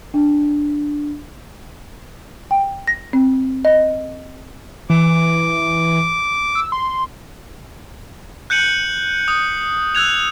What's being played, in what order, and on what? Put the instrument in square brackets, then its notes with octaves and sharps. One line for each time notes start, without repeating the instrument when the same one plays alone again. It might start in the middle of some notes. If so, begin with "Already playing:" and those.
[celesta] D4
[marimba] G5
A#6
C4
D#5
[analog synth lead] E3 [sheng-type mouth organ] D6
[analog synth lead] E6
C6
[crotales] F#6 G6 C#7 D#7 F#7
D#6
E6 F#6 G#6 F7